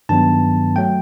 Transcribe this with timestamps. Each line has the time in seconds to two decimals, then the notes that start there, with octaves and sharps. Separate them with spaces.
0.09 G2 D#3 F#3 B3 A5
0.76 F#3 A3 G5